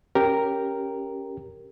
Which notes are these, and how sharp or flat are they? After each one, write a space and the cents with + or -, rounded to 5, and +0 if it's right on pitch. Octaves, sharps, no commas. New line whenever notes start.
C#4 +0 G4 +0 A#4 +0